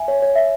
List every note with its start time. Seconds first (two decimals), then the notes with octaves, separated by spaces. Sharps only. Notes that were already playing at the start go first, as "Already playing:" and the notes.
Already playing: E5 G#5
0.08 C#5
0.22 C#5
0.35 E5